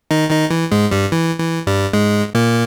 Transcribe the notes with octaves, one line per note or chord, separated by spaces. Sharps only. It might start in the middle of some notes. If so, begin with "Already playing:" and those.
D#3 D#4
D#3 D#4
E3
G#2 G#3
G2 G3
E3
E3
G2 G3
G#2 G#3
A#2 A#3